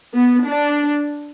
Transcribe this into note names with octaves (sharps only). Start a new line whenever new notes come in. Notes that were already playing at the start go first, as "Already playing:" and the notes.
B3
D4